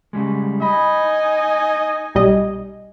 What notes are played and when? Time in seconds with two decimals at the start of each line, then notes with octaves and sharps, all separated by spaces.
0.13 C#3 G3 G#3
0.62 D#4 D#5 G#5 B5
2.15 B1 G3 D#5